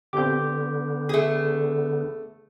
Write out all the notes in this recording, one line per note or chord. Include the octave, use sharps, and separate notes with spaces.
D3 B3 C4 G4 D6 G6
A3 G#4